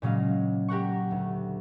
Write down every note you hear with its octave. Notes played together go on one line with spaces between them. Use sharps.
A#2 C#3 F#3 G#3 F5
G4 A#4 F#5 C#6
D2